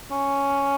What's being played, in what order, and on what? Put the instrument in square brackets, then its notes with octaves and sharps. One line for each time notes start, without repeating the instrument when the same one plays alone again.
[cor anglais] C#4